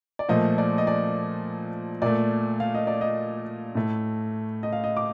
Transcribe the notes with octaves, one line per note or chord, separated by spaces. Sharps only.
D5
A#2 F3 A3 D#5
D5
D#5
D5
A#2 A3 D5
F5
D#5
D5
D#5
A2 A3
D#5
F5
D#5
D6